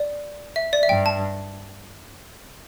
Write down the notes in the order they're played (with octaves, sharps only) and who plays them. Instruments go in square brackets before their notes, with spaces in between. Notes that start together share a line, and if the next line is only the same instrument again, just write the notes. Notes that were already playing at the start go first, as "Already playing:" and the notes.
Already playing: [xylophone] D5
E5
D5
E5
[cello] G2 [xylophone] G5
[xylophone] A5